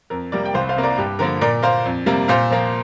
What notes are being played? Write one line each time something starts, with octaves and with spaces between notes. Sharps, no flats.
F2 A#4
C3 G3 A#3 A#4 D5
G5
C2 C5 F5
C5 F5
C3 A#3
A#4 D5
G2 G4
D3 F3 A#3 A#4
A#2 A#4 D5
A#3 C5 F5
F2
C3 G3 A#3
A#2 C5 F5
F3 A#3